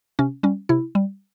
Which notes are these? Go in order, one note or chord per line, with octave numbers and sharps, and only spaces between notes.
C3 C#4
G3 C#4
C3 E4
G3